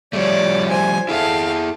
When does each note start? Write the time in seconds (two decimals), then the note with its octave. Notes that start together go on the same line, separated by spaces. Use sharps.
0.13 F3 G3 A3 C#5 D5
0.71 C5 G#5
1.09 E4 G#4 A4 E5 F5